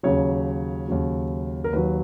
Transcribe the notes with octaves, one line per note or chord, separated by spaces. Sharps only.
D#2 C#3 F#3 C#5
D#2 C#3 F#3
A#4
D#2 D#3 F#3 B4